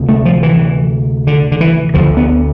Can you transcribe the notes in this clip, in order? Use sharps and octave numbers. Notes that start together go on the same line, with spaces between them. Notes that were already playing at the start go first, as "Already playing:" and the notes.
Already playing: D2 C3
A3
F3
E3
D3
D3
E3
D2 D3 F3
B3